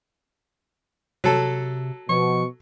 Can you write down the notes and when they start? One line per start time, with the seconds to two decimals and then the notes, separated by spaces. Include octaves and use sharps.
1.24 C3 F#3 A4
2.09 B2 F3 C#6